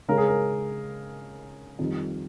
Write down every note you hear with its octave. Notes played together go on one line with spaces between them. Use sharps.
C#3 G#3 C#4 A#4
G#4
A#4
F2 D#3 G3